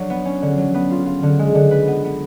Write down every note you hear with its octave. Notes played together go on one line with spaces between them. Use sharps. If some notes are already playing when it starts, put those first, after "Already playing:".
Already playing: F#3 D4
B3
C#4
D3
F#3
B3
F4
F4
D3
G#3
D3
B4
B3
B3